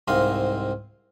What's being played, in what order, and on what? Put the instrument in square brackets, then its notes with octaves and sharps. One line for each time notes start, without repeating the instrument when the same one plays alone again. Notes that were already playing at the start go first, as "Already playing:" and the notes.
[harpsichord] C2 G#2 C4 D#5 F5